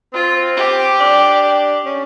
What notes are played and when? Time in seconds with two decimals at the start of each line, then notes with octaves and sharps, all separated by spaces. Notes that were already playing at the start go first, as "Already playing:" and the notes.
0.13 C4 F4
0.57 G4
1.00 D4
1.86 C#4